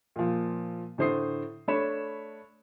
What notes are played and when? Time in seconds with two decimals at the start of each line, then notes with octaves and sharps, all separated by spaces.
0.16 A#2 F3
0.98 A2 D3 C5 D#6 C7
1.68 A3 D4 C#5 B5 E7